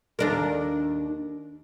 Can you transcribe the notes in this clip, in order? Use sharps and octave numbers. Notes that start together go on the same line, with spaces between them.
D#2 D4 A#4